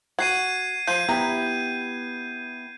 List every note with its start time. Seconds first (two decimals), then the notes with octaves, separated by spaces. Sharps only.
0.19 F#4 G#6 C7 D#7
0.87 F3 G6 D#7
1.09 B3 E4 G4 A#5